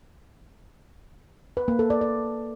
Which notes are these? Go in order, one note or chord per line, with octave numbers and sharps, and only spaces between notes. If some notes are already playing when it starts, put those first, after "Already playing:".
B4
A#3
A4
D5
D5